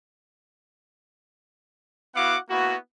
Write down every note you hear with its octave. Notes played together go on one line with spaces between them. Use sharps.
B3 E4 F#4 F5 F#5 D6
A#3 B3 E4 F#4